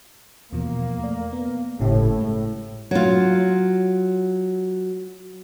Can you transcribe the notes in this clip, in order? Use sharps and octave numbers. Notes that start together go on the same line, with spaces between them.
E2 B2 F3 A#3
A3 D5
B3
G1 A2 C#3 G4
G#3
F#3 F4